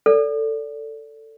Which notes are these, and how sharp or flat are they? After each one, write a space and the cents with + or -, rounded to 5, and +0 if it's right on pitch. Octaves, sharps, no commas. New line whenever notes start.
A4 +15 D5 -25